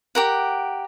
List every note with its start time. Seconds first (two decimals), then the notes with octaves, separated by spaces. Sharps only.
0.15 G4 A#4 F#5